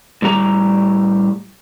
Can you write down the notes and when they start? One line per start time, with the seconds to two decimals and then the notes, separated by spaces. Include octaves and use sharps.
0.22 A2 G3 G4 A#5